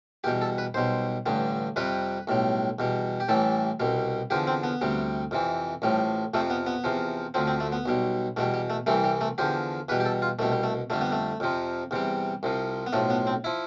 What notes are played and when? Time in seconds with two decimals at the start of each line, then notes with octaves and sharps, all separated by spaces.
0.24 E2 B2 G3 G4
0.41 A4
0.58 B4
0.74 B1 B2 G3 C5
1.26 A1 G2 D3 G3
1.76 F2 C3 G3 B4
2.27 B1 A2 G3
2.79 E2 B2 G3
3.20 G4
3.29 A1 A2 E3 G3 A4
3.80 C2 B2 G3
4.30 E2 D3 F3 G4
4.47 C4
4.63 B3
4.81 D2 C3 G3
5.31 F2 C3 E3
5.82 A1 A2 F3 G3
6.34 F2 C3 F3 A3
6.50 B3
6.67 B3
6.84 E2 C3 F3
7.34 D2 D3 F3 C4
7.47 C4
7.60 A3
7.72 B3
7.86 B1 B2 G3
8.37 E2 B2 G3 A3
8.54 G3
8.70 A3
8.86 C2 C3 E3 G3 A3
9.04 G3
9.21 A3
9.38 E2 D3 F3 G4
9.89 E2 B2 G3 B4
10.00 G4
10.05 A4
10.22 F4
10.39 C2 B2 G3 A3
10.52 G3
10.63 A3
10.90 F2 D3 G3 A3
11.01 B3
11.12 A3
11.40 F2 C3 F3
11.91 E2 C3 G3
12.43 C2 C3 F3
12.86 B3
12.93 B1 A2 F3 A3
13.10 B3
13.27 C4
13.44 F3 E4